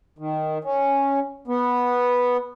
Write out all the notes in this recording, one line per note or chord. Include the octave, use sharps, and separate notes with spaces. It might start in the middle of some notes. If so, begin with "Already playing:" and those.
D#3
C#4
B3